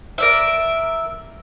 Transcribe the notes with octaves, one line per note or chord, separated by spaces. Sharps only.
A#4 D5 E5